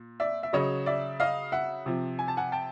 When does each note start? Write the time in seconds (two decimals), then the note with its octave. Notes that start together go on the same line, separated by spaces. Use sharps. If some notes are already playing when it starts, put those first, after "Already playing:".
Already playing: A#2
0.20 D5 E5
0.43 E5
0.53 C#3 F#3 C#5 D#5
0.86 D5 E5
1.20 D#5 F5
1.52 E5 F#5
1.86 C3 F3
2.19 G#5
2.28 A5
2.37 F#5 G#5
2.52 G5 A5